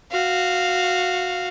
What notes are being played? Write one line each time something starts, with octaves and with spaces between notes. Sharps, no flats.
F#4 F5